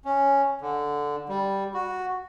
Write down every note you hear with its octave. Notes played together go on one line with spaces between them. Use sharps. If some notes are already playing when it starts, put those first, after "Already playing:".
C#4
D3
G3
F#4